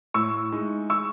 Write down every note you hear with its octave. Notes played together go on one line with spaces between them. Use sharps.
A2 C#6 E6
G#3 D#4
C#6 E6